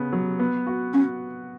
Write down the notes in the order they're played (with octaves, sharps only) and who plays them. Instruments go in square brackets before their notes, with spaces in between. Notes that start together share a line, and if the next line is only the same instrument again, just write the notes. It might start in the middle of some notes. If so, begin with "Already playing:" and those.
Already playing: [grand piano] C#3 B3
F#3
B3
F#4
[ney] C#4 [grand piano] F#4